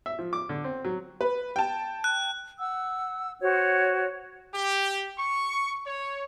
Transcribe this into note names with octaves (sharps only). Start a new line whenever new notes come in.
E5
F3
D6
D3
C4
F#3
B4
G5 A5
F#6
F#5 E6
F#4 C5 C#5
G4
C#6
C#5